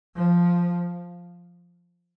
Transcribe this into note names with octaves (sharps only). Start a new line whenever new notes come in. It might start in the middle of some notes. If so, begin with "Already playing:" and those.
F3